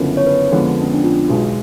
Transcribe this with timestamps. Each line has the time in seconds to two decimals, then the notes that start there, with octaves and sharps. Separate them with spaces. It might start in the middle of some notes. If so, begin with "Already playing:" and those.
Already playing: F#1 F#2 D3 F3 B3
0.17 C#5
0.27 B4
0.52 F2 D3 F3 G#3 B3
0.82 C#4
0.93 D4
1.04 F4
1.29 B1 B2 G#3 F#4